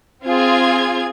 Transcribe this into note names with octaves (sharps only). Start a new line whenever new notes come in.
C4 F4 G#4 G#6